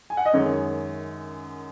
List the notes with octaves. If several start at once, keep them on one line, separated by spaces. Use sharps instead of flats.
G#5
F#5
D#5
F#2 D#3 G#3 C#5